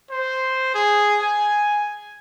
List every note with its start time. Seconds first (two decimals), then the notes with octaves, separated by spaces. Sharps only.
0.11 C5
0.74 G#4
1.21 G#5